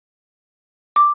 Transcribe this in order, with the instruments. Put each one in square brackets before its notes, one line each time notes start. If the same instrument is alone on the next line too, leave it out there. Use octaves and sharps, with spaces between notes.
[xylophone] D6